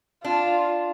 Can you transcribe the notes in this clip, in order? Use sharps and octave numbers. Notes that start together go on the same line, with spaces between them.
D4 F4